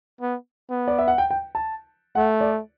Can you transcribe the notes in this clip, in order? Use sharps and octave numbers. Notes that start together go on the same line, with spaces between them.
B3
B3
D5
E5
F#5
G5
G5
A5
A3 F#5
D5